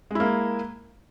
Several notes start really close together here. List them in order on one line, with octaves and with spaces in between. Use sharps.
G#3 E4 A#3